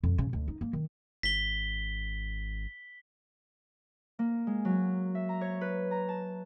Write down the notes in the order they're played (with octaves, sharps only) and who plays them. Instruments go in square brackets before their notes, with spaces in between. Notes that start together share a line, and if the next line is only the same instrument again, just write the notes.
[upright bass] F2
C#3
D2
D#4
A#3
D#3
[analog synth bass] G#1 [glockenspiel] B6 G7
[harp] A#3
G#3
F#3
E5
A#5
C#5
B4
A#5
A5